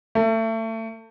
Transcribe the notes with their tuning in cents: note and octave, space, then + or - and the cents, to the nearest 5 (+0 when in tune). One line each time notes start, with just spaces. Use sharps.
A3 +30